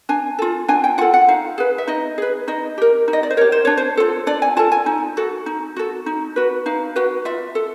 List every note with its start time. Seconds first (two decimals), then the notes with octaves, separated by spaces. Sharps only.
0.09 D4 G#5
0.39 F4 A4
0.68 D4 G#5
0.84 G5
0.98 F4 A4 F#5
1.14 F#5
1.28 D#4 F5
1.58 G#4 B4
1.78 E5
1.87 D#4 D#5
2.18 G#4 B4
2.48 D#4 D#5
2.78 G4 A#4
3.08 D#4
3.13 D#5
3.23 D5
3.30 C5
3.37 G4 A#4 C#5
3.52 C5
3.65 D4 C#5
3.77 C5
3.97 F4 A4
4.27 D4 D5
4.42 G#5
4.57 F4 A4 A5
4.72 G#5
4.86 D#4
5.17 F#4 A4
5.46 D#4
5.76 F#4 A4
6.06 D#4
6.36 F#4 B4
6.66 D#4 F5
6.96 F#4 B4
7.25 F4 E5
7.55 A4